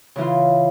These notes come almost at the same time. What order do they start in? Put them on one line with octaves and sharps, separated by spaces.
C#3 E3 F4